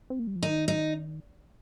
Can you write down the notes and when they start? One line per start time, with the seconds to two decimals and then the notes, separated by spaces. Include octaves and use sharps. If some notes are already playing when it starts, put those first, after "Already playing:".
0.10 C4
0.19 A#3
0.27 G3
0.36 F3
0.43 D#3 D#4
0.68 D#4